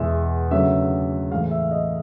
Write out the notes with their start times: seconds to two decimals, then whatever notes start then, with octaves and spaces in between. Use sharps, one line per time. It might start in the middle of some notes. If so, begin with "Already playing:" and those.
Already playing: E2 B2 G#3 E5
0.51 D2 C#3 F#3 E5
1.31 A2 E3 G#3 F5
1.51 E5
1.71 D#5